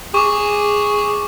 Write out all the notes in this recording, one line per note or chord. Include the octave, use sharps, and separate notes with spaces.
G#4 C#6 D6